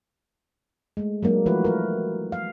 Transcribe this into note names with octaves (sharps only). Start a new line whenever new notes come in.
G#3 A3
F#3 G#3 A#3 D4
E3 F3 A3 E4 F#4 B4
A#4 B4
F5